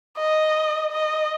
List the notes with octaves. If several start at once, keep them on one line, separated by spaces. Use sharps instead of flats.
D#5
D#5